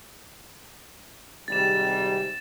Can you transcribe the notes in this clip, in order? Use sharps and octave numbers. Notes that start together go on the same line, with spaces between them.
G#1 C3 G3 A6 E7